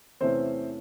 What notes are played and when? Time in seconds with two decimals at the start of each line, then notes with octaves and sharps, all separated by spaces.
0.21 E2 C3 E3 A3 C4 C#4 C5